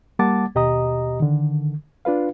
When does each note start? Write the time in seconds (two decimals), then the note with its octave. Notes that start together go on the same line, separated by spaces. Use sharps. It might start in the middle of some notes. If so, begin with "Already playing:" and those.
0.19 G3 A#3 F#5 A5 D6 A6
0.55 D#2 B2 G4 D#5 A#5 D#6
1.20 D3 D#3
2.05 D4 F4 B4 F5